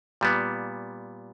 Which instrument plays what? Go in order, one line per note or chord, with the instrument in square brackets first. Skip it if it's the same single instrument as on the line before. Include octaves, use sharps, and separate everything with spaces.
[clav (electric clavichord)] A#2 G3 B3